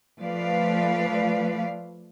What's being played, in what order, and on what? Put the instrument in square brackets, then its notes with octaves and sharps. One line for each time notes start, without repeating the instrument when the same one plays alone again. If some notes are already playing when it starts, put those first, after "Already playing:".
[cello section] F3 A3 B4 D5 F5